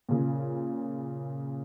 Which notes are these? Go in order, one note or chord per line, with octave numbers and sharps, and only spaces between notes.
A#2 C#3